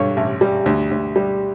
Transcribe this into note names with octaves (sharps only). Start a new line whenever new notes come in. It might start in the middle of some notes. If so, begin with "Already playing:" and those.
Already playing: G2 D3 G3 C#5
A1
G3
D2
D2
G3